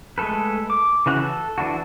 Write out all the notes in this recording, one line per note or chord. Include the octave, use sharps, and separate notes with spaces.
G#3 A3 A4 B4
D6
C#3 E3 F#4 F#6
A4
E3 D4 E4 F#4